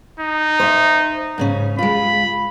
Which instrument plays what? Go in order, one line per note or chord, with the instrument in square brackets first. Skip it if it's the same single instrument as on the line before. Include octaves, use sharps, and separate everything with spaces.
[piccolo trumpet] D#4
[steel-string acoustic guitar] C5 E5
G#2 C#3 C#4
[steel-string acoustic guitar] G#3 F4 [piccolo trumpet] B5